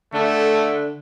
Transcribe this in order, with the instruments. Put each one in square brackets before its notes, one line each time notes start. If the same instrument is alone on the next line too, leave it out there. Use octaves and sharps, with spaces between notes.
[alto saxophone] D3 [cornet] A3